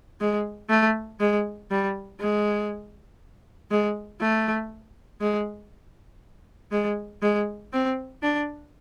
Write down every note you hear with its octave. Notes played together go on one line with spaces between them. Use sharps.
G#3
A3
G#3
G3
G#3
G#3
A3
G#3
G#3
G#3
C4
D4